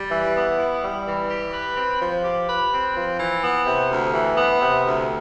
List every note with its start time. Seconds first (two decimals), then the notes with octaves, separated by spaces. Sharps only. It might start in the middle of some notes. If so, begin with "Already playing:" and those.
Already playing: G3
0.11 E3
0.35 B3
0.59 E4
0.83 G3
1.06 E3
1.30 G4
1.53 B4
1.77 C4
2.01 F3
2.24 G4
2.48 B4
2.72 C4
2.96 F3
3.19 E3
3.43 B3
3.66 C3
3.90 D2
4.14 E3
4.38 B3
4.62 C3
4.85 D2